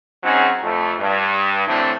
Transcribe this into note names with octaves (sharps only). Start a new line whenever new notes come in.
F#3 C4 C#4 D#4 F#4 G#4
F2 A3
G2
A2 D3 E3 A3 C4 D4